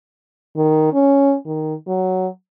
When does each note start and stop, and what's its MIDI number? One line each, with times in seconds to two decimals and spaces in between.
0.56 0.89 51
0.93 1.36 61
1.46 1.74 51
1.87 2.27 54